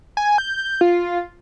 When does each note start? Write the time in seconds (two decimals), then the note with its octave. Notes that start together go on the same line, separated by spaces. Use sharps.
0.17 G#5
0.38 G6
0.81 F4